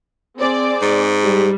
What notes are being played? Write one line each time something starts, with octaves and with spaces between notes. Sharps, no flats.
C4 G#4 D5
G#2
G3